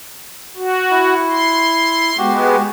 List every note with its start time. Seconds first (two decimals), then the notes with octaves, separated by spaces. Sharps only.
0.57 F#4
0.91 E4
1.30 C6
2.18 G#3 B3 F#4 G4